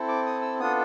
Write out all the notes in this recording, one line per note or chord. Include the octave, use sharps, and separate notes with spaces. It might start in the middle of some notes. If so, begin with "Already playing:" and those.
Already playing: C4 E4 A4
D6
D#6
E6
B3 D4 F4 A4 D#6